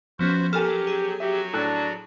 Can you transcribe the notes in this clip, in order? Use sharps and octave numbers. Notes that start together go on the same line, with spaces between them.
F3 B3 C#4 F#4 C5
F#3 G4 A4 A#4 G#5 F6
G#4
F#3 F#4 G4 E5
A2 D4 A4 F#6